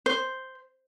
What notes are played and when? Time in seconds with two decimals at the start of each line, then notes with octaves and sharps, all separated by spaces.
0.06 C5